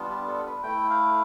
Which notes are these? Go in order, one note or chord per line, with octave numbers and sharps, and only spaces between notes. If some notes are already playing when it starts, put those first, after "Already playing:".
Already playing: G3 B3 D4 F4
G4
A4
B4
A3 E4 G5
F5